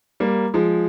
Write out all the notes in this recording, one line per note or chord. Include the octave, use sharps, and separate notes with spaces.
G3 A#3
F3 G#3